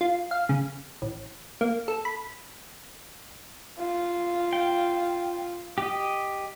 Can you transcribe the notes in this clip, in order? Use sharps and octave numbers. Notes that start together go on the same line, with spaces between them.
F4
F5
C#3
A1
A#3
A4
B5
F4
G5
G4 D#5